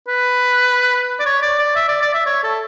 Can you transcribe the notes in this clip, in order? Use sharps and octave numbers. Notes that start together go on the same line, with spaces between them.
B4
D5
C#5
D5
D5
E5
D5
D5
E5
C#5
A4